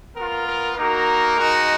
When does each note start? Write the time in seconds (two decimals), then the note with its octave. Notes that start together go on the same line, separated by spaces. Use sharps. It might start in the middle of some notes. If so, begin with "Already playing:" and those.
0.16 B3 F4 A#4
0.46 A#4
0.76 A#3 D#4 F#4 A#4
1.37 G#3 D#4 F#4